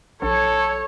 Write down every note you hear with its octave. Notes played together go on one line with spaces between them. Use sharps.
A#1 A4 C#5